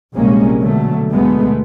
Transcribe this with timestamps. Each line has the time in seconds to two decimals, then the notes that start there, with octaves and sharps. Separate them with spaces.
0.14 A#1 C3 G3 G#3 A#3 C#4
0.60 B2 D3 F#3 A3
1.11 D2 B2 G#3 A3 B3